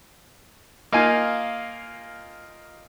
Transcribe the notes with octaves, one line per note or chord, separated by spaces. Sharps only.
A#3 D#4 F4 G#5